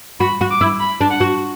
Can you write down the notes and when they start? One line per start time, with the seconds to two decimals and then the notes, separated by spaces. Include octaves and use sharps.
0.20 F#4 B5
0.41 F#4
0.51 D6
0.61 E4
0.80 B5
1.01 D4
1.10 F#5
1.21 F#4